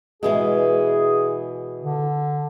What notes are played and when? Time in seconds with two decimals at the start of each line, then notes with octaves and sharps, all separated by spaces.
0.23 B2 E3 G#3 G#4
1.82 D3